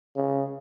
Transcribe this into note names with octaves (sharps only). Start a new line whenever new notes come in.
C#3